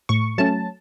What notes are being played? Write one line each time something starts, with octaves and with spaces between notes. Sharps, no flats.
A2 C#6
F#3 A3 C#4 A5